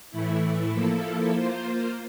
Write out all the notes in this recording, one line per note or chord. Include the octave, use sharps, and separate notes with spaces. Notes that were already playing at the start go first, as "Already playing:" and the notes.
A2 E3 A3 E4
F3 A#3 E4 A4
A#3 F4 C5